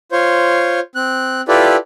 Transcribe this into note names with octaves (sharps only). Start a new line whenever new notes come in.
F4 C5 C#5
C4 F#6
E4 F4 G4 A4 B4 D5